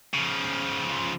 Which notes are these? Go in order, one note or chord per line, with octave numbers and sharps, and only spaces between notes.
C#3 F3